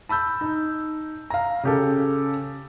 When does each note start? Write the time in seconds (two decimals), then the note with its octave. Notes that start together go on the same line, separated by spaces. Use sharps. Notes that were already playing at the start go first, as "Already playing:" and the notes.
0.09 A5 B5 E6 G6
0.41 D#4
1.30 F5 A#5
1.63 C#3 G4 A4